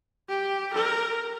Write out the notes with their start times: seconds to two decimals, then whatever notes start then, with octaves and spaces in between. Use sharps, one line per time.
0.29 G4
0.74 A#4